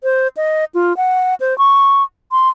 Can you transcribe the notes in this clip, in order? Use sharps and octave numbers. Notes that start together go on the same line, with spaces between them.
C5
D#5
F4
F#5
C5
C#6
C6